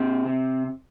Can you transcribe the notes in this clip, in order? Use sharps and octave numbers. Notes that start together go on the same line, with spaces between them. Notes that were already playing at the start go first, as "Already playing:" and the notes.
Already playing: A#2 C4
C3